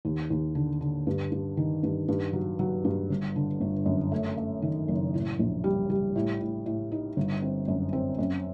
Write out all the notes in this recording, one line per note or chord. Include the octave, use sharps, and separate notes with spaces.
D#2
D#2
D3
D3
G2
G2
D#3
G2
G2
F#3
F#3
G2
G1
D3
G1
F#2
A3
A3
D#3
F#1
A2
A#1
G3
G3
A2
A2
A2
D#4
G1
C4
F#2
C4
F#2